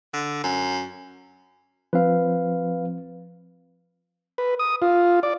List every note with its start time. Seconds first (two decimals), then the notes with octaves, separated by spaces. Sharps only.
0.14 D3
0.44 F#2
1.93 F3 C4 B4 F5
4.38 B4
4.59 D#6
4.82 F4
5.23 D5